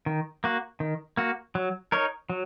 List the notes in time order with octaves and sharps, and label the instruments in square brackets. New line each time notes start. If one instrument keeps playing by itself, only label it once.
[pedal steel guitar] D#3
A#3 F#4
D#3
A#3 F#4
F#3
D#4 A#4 C#5
F#3